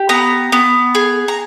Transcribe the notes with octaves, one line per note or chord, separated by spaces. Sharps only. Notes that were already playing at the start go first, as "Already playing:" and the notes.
Already playing: G4
B3 A#5
B3
G#4
A#5